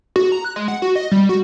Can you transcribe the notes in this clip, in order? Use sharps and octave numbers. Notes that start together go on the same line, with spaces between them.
F#4
A#5
F#6
G#3
F#5
F#4
D#5
G3
F#4